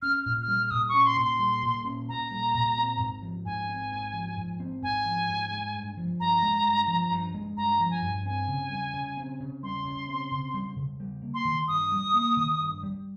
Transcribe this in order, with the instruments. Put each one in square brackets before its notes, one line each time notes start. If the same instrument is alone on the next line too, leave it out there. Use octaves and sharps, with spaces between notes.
[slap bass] C#4 [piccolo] F6
[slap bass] A#2 [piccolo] F6
[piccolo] F6
[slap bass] G3
[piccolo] F6
[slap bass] A#2 [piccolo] D#6
[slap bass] C#4 [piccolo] C#6
[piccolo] C6
[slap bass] A#2
[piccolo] C6
[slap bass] G3
A#2
C#4
[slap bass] A#2 [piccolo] A#5
[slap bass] G3
A#2
C4
G#2
F3
[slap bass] G#2 [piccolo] G#5
[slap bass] C4
G#2
F3
G#2
C4
[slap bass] G#2 [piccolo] G#5
[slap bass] F3
G#2
G#3
G2
F3
[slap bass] G2 [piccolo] A#5
[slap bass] G#3
G2
F3
G2
G#3
[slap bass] G2 [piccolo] A#5
[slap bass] F3
[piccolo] G#5
[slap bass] G2
[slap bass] C4 [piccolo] G#5
[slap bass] C#3
G3
C#3
C4
C#3
[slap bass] G3 [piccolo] C6
[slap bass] C#3
C4
C#3
G3
C#3
G3
A#3
[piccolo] C6
[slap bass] D#3
[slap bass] G2 [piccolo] D#6
[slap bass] G3
A#3
D#3
G2
G3